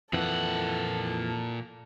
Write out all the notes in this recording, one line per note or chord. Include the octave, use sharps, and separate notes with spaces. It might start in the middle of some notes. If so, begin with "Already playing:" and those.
F2 A#2 E3 A4 F#5